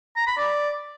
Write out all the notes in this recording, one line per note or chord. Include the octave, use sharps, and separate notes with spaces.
A#5
B5
D5